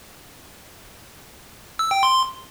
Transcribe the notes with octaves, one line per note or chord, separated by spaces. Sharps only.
E6
G5
C6